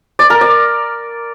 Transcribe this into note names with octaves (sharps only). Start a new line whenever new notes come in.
D5
A#4
D5